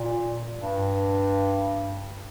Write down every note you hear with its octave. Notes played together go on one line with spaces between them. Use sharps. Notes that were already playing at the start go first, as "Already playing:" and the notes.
Already playing: A#2
G2